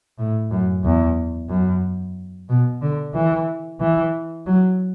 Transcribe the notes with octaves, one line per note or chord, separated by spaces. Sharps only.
A2
F#2
E2
F#2
B2
D3
E3
E3
F#3